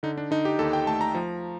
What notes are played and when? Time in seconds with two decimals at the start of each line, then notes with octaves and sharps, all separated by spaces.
0.03 D3 D#4
0.18 D4
0.31 D3 D#4
0.45 G4
0.59 D#2 A4
0.73 G5
0.87 A3 A5
1.01 A#5
1.15 F3